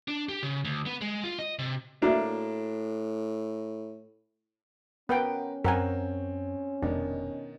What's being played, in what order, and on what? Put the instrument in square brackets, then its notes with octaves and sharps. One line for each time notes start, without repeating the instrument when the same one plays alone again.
[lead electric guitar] D4
G4
C#3
D2
B3
G#3
F4
D#5
C3
[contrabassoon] A2 [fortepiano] A#3 D4 [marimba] F#4 E5
[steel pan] B3 F#5 G5 [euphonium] C#4 [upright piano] A#4 B4
[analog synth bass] F#2 [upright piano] C4 C#5 [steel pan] A#4 F#5 G#5
[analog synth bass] F1 [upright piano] B2 D#3 [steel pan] D4